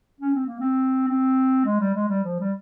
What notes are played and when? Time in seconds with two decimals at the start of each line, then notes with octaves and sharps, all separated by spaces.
0.20 C#4
0.34 C4
0.46 A#3
0.60 C4
1.08 C4
1.65 G#3
1.80 G3
1.94 G#3
2.08 G3
2.24 F3
2.40 G3